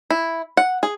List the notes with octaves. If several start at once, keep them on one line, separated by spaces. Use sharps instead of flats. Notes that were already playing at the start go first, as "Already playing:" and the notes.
E4
F#5
G#4